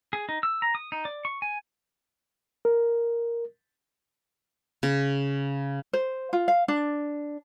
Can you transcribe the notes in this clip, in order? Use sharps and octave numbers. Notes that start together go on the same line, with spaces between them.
G#4
D#4
E6
A#5
D#6
D#4
D5
C#6
G#5
A#4
C#3
C5
F4
F5
D4